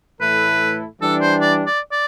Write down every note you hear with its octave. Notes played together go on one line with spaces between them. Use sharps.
A2 E3 A3 E4 A4 B4
E3 G3 D4 A4
C5
D5
D5
D5